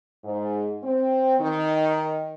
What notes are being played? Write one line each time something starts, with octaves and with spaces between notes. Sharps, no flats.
G#2
C4
D#3